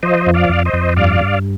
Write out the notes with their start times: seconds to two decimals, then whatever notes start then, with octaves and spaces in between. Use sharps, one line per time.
0.03 F3 C5 D#5
0.27 F2
0.34 D5 F5
0.49 F2
0.65 C5 D#5
0.73 F2
0.96 G2 D5 F5
1.21 G2